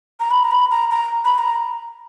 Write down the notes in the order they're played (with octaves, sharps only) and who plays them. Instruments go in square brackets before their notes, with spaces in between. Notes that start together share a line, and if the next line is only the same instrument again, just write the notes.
[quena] A#5
B5
A#5
B5
A#5
A#5
B5
A#5